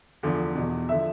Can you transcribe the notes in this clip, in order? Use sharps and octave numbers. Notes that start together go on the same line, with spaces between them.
E2 D3 F3
E2 B2
D3 F3 E5